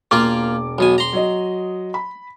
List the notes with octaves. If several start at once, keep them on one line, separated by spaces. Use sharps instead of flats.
E1 A#3 F4 D6
B1 B2 G#5
A#5 C6
F#3 D#5
B5